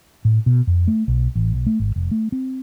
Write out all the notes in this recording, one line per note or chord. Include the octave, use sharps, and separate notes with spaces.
A2
B2
F2
A3
B1
A1
B1
A3
G#1
F1
A3
C4